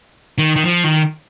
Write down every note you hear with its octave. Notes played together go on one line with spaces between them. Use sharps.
D#3
D#3
F3
D#3